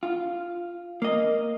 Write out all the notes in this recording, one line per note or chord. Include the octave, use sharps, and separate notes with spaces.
F4
A#3 D#5